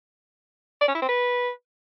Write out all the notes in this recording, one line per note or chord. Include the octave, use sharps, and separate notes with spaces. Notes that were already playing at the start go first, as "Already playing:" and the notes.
D5
C#4
E4
C4
B4